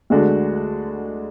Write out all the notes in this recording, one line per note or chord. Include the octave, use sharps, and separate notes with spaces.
D2 D3 G#3 D4 F#4